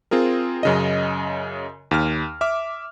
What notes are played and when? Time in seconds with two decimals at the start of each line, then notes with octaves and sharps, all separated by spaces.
0.11 C4 F4 G#4 A#4
0.63 F#2 C#3 D#5
1.91 D#2 F6
2.41 E5 D6 F6